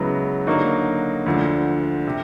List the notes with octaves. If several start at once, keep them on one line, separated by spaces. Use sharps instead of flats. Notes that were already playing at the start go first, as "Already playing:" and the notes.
Already playing: C#2 C#3 F#3 B3 E4
D3 F#3 A#3 D#4 F#4
D2 D3 F3
C3